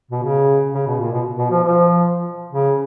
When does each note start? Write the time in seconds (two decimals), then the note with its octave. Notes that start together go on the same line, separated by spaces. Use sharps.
0.11 B2
0.23 C#3
0.74 C#3
0.87 B2
1.00 A#2
1.13 B2
1.38 B2
1.51 F3
1.64 F3
2.53 C#3